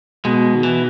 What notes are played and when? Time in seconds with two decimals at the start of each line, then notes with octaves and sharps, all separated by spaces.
0.25 B2 G#3
0.55 D#3
0.63 E3